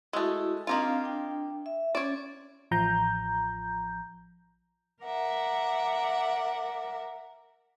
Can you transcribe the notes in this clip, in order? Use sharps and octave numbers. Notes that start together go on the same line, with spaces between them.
G#3 A3 E4 F#4
D#3 A#3 C4 D4 F4 F5
D4 G5
E5
C#4 C#5 D5
A1 F3 A#5 G6
A#4 D5 E5 F#5